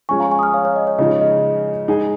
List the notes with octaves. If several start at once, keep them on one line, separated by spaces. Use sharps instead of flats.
F3 G#3 C#4 G#5 C#6
F5 A#5
G#5 C#6
D#6
C#6 F6
C#5 F5
C#5 F5
D#5
C#5
C#3 F3 G#3 D#4 G#4 D#5
D#5
G#3 D#4 G#4